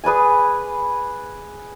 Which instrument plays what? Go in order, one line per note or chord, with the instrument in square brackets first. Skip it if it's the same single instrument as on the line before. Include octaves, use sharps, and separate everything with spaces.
[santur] G#4 B4 D5 G#5